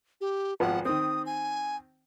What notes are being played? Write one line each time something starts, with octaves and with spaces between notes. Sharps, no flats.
G4
G#1 F3 B3 F#5
D#3 C4 D#6
G#5